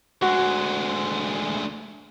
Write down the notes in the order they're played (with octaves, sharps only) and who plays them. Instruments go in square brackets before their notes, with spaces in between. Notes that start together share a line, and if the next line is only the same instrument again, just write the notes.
[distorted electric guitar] D2 G#3 [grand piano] F#4